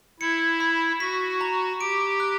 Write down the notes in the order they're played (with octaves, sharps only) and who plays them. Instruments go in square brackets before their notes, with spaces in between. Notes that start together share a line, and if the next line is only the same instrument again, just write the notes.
[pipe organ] E4 [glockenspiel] C#7
[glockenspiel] B5
[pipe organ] F#4 [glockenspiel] B6
[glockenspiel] A#5
[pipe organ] G4 [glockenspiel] D7
[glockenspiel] F#6